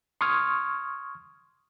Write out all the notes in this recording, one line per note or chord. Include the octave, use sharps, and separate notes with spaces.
C6 C#6 D#6 F6 G#6